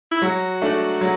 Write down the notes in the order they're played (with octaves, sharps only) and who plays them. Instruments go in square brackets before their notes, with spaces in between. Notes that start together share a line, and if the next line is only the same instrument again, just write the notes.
[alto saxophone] E4
[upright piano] F#3 [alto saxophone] F#4
[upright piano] A3 D4
F#3